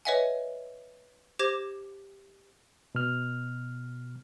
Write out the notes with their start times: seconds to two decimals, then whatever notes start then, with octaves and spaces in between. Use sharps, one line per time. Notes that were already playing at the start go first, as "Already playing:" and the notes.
0.05 B4 C#5 D#5 E5 F#5 G#5
1.39 G4 C5 D6 G#6 A#6 E7
2.95 B2 F6